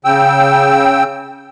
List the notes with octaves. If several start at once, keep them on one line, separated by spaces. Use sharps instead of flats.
C#3 G5 E6